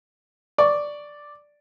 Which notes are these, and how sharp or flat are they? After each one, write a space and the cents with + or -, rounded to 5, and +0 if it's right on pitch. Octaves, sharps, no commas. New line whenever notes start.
D5 +0 C#6 +15